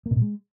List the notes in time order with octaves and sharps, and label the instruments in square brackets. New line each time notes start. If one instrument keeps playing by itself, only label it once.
[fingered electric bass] A#3
B2
A#2
G#3